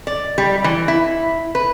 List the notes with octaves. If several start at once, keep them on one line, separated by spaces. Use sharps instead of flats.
D5
G3
E3
E4
B4